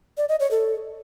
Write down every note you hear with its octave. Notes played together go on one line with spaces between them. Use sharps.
D5
D#5
C#5
A4